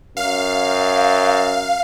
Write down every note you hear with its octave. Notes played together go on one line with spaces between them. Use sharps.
F#2 F5